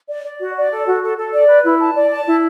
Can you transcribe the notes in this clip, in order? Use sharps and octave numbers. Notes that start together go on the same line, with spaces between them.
D5
D5
F#4
D5
A4
F#4
A4
A4
D5
B4
E4
A5
D5
A5
E4